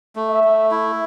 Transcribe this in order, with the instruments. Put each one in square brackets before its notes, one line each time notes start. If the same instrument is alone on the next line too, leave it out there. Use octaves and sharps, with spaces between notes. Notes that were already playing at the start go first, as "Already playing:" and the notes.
[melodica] A3
[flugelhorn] E5
[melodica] A3
E4